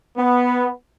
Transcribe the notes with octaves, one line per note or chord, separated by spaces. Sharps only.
B3